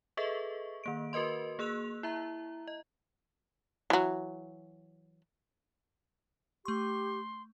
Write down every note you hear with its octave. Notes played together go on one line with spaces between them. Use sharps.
G#4 A4 B4 D#5 E5 C#6
D#3 A#3 D7
F#4 A#4 B4 D#5 C6
A#3 G#4 E6 F#6 F7
E4 E5 A#5
D#5
E3 F#3
A3 G4 C6 C#6